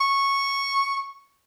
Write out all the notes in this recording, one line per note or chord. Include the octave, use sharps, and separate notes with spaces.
C#6